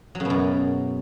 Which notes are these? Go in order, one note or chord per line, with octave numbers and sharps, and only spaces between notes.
F#3
C#3
B2
F#2